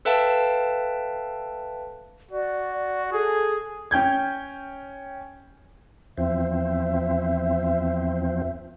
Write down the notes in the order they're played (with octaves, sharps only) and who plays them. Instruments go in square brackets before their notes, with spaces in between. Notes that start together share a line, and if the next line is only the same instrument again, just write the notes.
[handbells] A4 B4 E5 F5 G5 A5
[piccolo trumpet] F#4 [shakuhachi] D5
[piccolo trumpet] G#4 [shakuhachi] A4
[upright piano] C#4 G5 G6 G#6
[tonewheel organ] E2 F3 C4 [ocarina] E5